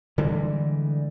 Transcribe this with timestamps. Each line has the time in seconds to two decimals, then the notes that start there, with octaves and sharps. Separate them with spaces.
0.18 D3 E3 G3 G#3